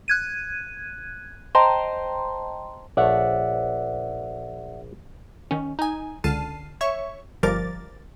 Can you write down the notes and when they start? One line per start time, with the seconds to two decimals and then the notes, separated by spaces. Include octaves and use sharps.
0.08 F#6 G#6 D#7
1.55 C5 D#5 G5 A5 A#5 C6
2.97 A#1 A3 C#5 D5 E5 F#5
5.51 D#3 C#4
5.79 D#4 G#5
6.24 C#2 D3 A5 F6 C7 D#7
6.81 C#5 E5 C#6
7.43 G1 F3 G3 A#4 D6 A6